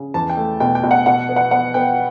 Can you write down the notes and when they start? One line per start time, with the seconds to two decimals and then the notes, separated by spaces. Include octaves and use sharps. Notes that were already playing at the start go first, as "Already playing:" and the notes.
Already playing: C#3
0.14 E2 A5
0.30 G5
0.37 A3
0.60 B2 G5
0.75 G5
0.84 B2
0.91 F#5
1.06 B2 F#5
1.29 B3
1.36 F#5
1.51 B3 F#5
1.74 B3 G5